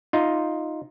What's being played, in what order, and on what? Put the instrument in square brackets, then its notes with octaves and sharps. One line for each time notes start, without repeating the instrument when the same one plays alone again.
[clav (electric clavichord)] D#4 F4